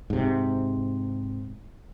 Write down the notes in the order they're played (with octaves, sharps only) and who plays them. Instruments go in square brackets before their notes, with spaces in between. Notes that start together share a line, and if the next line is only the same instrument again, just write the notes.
[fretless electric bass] G#2 C3